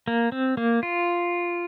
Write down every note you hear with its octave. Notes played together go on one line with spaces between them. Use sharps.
A#3
C4
A#3
F4